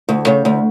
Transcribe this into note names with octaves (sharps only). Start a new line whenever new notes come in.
D2
C#3
D2